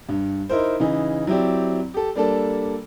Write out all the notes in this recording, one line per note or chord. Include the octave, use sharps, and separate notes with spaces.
G2
D#4 E4 A#4 C5
C#3 E3 D#4
F#3 C4 E4 G4 D5
G4 A4
G3 A#3 D4 A4